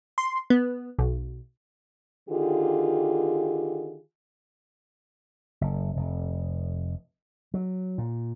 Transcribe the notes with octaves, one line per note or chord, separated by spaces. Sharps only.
C6
B3
B1
D3 D#3 F4 G4 G#4
F#1
F1
F#3
A#2